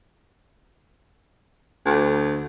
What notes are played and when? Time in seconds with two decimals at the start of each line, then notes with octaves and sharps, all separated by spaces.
1.86 D2